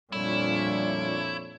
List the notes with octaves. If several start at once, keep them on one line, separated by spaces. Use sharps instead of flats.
F2 A#2 F3 G3 D4 E4 C#5